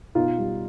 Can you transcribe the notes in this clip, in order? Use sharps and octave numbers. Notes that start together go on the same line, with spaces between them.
B2 D#4 F4
G3